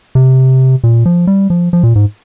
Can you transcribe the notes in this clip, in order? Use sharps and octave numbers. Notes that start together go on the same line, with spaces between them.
C3
A#2
F3
G3
F3
F3
A#2
G#2